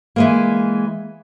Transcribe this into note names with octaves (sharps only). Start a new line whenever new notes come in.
E3 G#3 A#3